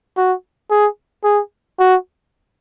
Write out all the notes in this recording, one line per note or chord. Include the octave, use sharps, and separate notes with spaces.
F#4
G#4
G#4
F#4